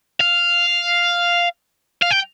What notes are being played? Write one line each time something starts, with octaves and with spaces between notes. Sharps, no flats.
F5
F5
G5